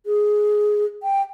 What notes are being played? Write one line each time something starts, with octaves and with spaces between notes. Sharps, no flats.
G#4
G5